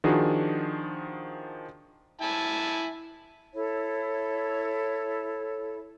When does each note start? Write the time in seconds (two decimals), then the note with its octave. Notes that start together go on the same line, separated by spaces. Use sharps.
0.04 D#3 F3 D4 F#4 G#4
2.21 E4 G#5 A5
3.54 E4 A4 C#5